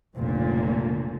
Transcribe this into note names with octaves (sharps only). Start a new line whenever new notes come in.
F1 C#2 A#2 D3